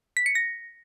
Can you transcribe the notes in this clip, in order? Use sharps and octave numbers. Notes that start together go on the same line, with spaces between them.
B6
C#7
A#6